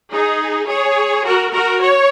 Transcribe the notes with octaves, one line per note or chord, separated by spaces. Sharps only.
D#4 G#4
G#4 C#5
F#4 A#4
F#4 A#4
C#5